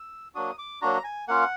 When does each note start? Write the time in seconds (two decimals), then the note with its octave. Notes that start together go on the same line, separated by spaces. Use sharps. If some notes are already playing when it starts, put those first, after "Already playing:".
Already playing: E6
0.35 F#3 A#3 D4 F#4 D#6
0.58 D6
0.82 F#3 A#3 D4 F#4 A#5
1.04 G#5
1.28 A#3 C#4 F4 F#5